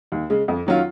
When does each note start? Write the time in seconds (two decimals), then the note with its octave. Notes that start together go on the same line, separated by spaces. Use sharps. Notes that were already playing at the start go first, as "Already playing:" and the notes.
0.12 D#2
0.30 C#3 G#3
0.48 F2
0.67 D#3 F#3 C#4 F4